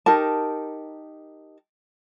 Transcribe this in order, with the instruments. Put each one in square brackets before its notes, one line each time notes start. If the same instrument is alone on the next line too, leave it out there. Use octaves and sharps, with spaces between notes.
[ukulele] D#4 G4 A#4 A5